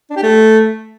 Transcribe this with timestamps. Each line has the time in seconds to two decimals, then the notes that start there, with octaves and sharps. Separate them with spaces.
0.10 D4
0.16 G4
0.23 A3